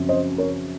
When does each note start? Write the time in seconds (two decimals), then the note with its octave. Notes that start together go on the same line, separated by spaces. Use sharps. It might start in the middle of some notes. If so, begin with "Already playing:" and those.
Already playing: F#2 C#3 F3 C4
0.09 C5 D#5
0.38 A#4 C#5